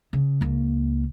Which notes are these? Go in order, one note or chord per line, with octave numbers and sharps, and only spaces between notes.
C#3
C#2 A#3